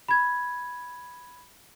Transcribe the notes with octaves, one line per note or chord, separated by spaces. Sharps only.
B5 G#6